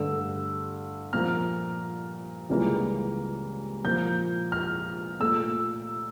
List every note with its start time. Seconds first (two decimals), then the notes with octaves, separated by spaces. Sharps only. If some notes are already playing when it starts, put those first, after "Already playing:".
Already playing: G2 D3 A3 E6
1.13 A#2 F3 A#3 F6
2.49 C#2 C#3 E3 G3 A#3
3.84 A#2 F3 A#3 G6
4.52 F6
5.20 A#2 A3 E6